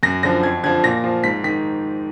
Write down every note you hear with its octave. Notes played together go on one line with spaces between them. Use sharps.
F#2 A#6
D3 F3 A#6
F2 G#6
D3 F3 G#6
A#2 A#6
F3
G#2 B6
D#3 B6